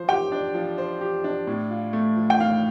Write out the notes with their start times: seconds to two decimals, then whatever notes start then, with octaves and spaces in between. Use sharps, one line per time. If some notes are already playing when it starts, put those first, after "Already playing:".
Already playing: F3 C5
0.08 G4 G5
0.32 D4
0.54 F3
0.78 C5
1.01 G4
1.24 D4
1.47 A2
1.70 F4
1.93 A3
2.16 F3
2.30 G5
2.40 A2 F5